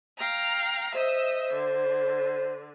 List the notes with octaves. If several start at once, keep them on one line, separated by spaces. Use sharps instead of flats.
F5 G5 A#5
C5 D#5 E5 E6
D3